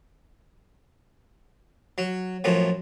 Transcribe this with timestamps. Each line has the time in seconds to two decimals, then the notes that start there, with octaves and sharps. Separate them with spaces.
1.98 F#3
2.44 F#2 A2 F3